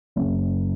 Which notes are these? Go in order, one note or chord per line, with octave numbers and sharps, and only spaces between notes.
F#1 F#2 C#3